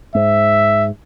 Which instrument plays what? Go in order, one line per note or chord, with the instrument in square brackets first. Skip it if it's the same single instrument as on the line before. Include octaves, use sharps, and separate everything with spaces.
[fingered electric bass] G#2 [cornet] E5